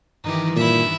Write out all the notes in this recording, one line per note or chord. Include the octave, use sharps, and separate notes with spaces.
G2 D#3 E3 D#4 G4
A#2 E4 E5